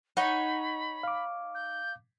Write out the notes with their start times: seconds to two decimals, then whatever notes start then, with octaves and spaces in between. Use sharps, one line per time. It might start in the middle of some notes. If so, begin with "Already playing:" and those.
0.17 D#4 C#5 F#5 B5
1.03 F5 D6
1.55 G6